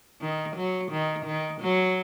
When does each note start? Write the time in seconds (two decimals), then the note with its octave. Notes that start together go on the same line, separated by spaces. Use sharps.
0.21 D#3
0.56 F#3
0.91 D#3
1.26 D#3
1.61 F#3